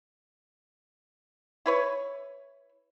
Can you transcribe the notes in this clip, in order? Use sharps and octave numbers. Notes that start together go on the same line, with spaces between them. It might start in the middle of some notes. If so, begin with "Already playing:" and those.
E4 B4 C#5